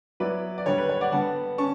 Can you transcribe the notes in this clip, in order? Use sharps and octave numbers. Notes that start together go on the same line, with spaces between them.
F#3 B3 E4 B4 D5
D5
D3 G3 D4 C#5
B4
C#5
D5 F#5
D3 G3 B3 F#5 A5
C#4 A5 C#6